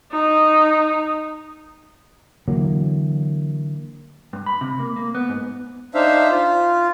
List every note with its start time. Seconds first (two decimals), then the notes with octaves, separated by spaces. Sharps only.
0.12 D#4
2.48 D3 E3 F#3 A#3
4.33 G2
4.46 B5
4.61 C3
4.79 A#3
4.96 A#3
5.15 B3
5.29 G#2
5.95 D4 D#4 C5 E5 F5
6.30 F4